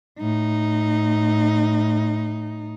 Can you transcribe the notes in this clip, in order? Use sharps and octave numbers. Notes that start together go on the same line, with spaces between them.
A2 D#4